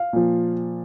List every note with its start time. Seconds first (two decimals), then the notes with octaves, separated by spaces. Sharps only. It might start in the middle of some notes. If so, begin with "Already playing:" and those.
Already playing: F5
0.13 A#2 F3